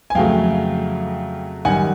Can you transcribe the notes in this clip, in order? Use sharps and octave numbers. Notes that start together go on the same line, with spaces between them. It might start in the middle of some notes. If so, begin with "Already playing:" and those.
G#5
F2 C#3 F#3 A3 F5 G5
F#2 D#3 G3 F#5 G#5